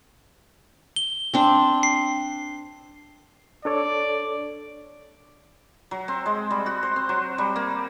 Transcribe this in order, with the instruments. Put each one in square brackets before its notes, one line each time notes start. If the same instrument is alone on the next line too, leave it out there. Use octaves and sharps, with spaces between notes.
[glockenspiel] G7
[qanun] C4 D4 A5
[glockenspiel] C7
[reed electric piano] D4 A4 C#5 [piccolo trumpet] D5
[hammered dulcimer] F#3
C4
G#3
G3
F#4
C5
C4
F#3
G3
A#3